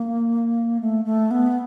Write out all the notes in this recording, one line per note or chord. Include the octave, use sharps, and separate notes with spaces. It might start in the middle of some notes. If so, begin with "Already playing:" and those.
Already playing: A#3
A3
A3
B3